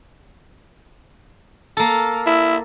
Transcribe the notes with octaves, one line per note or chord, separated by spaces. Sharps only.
A#3 A4
E4